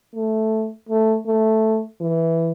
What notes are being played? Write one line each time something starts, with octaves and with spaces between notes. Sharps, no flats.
A3
A3
A3
E3